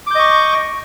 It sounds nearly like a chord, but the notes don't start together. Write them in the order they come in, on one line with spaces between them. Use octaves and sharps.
D6 G6 D#5 C#6